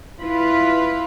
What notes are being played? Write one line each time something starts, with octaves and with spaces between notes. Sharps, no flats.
E4 F4 B4